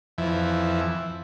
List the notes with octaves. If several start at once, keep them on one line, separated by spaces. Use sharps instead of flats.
F2 E3